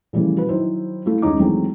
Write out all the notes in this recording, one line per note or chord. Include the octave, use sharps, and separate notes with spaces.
A#2 C#3 E3 F3 G3 A3
F#4 B4
D#3 F#3 E4 C5
A3 E4 F4
D#2 G#3 C#4 D#4 D6
D#3 E3 F#3 G#3 A3 C4